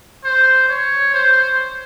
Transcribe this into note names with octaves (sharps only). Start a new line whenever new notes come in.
C5
C#5
C5